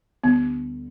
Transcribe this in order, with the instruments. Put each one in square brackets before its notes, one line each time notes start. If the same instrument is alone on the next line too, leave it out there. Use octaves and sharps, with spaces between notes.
[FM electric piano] D2 D3 G3 [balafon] B3